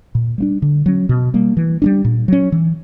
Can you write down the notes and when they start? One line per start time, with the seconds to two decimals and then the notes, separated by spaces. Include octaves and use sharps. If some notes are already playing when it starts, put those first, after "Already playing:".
0.15 A#2
0.38 G3 A#3 D4
0.62 D3
0.86 F#3 C#4
1.09 B2
1.34 G3 A#3
1.57 E3
1.82 G3 B3 D4
2.05 A#2
2.28 F#3 C#4
2.52 E3